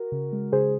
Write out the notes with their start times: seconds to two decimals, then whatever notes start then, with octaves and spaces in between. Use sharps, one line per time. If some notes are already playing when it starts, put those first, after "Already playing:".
Already playing: F#4 A#4
0.12 C#3
0.32 G#3
0.52 C#3 G#4 C5